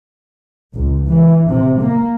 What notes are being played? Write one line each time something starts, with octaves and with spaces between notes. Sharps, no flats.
C#2
E3
C3
A#3